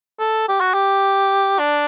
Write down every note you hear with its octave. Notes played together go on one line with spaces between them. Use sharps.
A4
G4
F#4
G4
D4